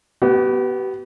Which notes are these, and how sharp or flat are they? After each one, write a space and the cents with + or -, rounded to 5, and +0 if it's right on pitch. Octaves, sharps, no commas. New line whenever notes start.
B3 +0 G4 -40